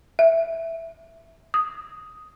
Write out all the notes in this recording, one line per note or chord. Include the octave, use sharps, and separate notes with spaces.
E5
D#6